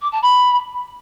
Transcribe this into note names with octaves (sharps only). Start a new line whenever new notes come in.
D6
A5
B5